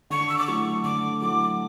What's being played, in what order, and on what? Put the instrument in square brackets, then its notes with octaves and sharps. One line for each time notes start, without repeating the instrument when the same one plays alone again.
[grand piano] D3 [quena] C#6
[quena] E6
D6
[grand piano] F#3 A3 E4 [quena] C#6
[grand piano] D3 [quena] D6
[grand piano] F#3 A3 E4 [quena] D6